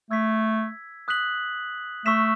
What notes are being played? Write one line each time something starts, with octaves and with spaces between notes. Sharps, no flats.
A3 E6 G#6 B6
D#6 F#6 B6 F#7
A3 C#6 E6 B6 E7